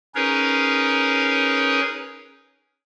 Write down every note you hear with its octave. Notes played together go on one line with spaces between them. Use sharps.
C#4 D#4 G#4 A#4 B4 C#5